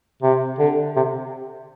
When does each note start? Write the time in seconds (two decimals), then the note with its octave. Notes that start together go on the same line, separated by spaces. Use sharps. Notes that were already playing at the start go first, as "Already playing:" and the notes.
0.23 C3
0.59 D3
0.96 C3